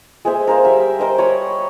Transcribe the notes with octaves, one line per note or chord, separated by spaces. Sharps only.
G#3 G#4 C5 E5
A#4 C5 F5
G3 E5
A#4 C5 D#5
C#5 B5 C#6 D#6